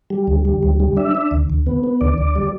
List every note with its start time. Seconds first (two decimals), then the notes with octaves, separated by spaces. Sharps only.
0.10 G3
0.28 D2
0.45 G3
0.63 D2
0.80 G3
0.97 D4 E5
1.15 D4
1.31 D2
1.50 D2
1.66 B3
1.84 B3
2.01 D2 D5
2.18 D2
2.36 G3